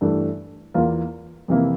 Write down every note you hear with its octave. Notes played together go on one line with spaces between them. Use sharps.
G2 E3 A3
E2 E3 A#3 F4
F2 C3 E3 A#3 E4